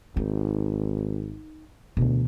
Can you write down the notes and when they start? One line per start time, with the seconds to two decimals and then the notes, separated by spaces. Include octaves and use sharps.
0.17 G#1 D#4
1.97 D2 B2 E3